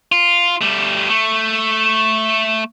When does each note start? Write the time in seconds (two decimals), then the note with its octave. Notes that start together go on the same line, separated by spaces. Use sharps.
0.12 F4
0.61 G3 A3
1.09 A3